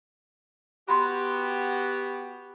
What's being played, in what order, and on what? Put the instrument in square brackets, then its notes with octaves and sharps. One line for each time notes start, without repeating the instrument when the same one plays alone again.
[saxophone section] B3 F#4 G4 [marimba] B5 C6